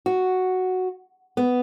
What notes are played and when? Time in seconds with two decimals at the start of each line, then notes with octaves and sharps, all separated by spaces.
0.06 F#4
1.37 B3